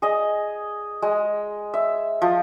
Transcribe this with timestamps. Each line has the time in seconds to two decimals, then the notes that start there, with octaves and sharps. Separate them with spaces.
0.02 G#4 D#5
1.02 G#3
1.74 E5
2.22 F3